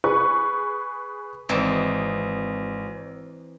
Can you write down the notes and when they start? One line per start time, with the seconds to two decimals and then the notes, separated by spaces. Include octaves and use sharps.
0.04 G#4 B4 C#6
1.49 G#1 E3 C4 D#4